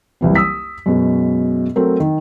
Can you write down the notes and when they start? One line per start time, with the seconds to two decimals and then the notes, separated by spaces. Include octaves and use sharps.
0.21 F#1 C2 E3 C4
0.36 D#6 E6 B6
0.86 F#2 B2 G#3
1.76 F#3 A3 C4 A#4
2.00 D#3